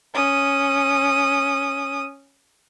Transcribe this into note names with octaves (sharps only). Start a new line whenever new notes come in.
C#4 D#6